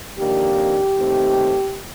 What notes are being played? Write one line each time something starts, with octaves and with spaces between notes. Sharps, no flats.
F2 D#3 A#3 D4 G4
D#2 D#3 A3 C4